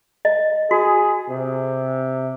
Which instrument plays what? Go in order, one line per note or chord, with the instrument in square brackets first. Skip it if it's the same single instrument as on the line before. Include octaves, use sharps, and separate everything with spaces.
[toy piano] D#5
[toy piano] F#4 [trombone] G#4
[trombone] C3